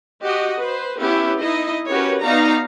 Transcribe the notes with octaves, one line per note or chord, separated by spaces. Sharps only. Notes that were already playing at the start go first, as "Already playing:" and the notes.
F#4 G4 D#5
B4 C5
B3 C#4 E4 G4
D#4 E4 D#5
C#4 F#4 G4 A#4 B4 C#5
B3 D#4 F#4 D5 F5 A#5